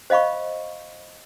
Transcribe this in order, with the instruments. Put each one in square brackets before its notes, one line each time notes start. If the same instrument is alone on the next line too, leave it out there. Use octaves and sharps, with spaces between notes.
[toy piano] C5 D#5 F5 B5 C#6